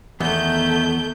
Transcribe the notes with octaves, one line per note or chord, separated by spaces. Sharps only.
E2 D#3 A3 B3 G6